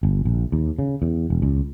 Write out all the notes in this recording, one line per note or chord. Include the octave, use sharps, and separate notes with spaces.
G1
A#1
D#2
C#3
E2
E1
C#2